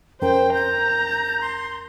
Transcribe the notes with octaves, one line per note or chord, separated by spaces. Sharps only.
F2 C#4 A#4 C5 G5
A#5 G6
C6